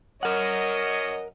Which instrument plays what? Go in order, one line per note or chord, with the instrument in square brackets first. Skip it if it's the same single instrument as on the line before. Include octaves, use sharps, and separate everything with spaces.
[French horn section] F#2 C#5 D#5 [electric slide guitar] A#4 F#5